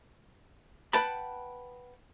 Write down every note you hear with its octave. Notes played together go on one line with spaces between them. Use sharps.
B4 F#5 G5 A5 B5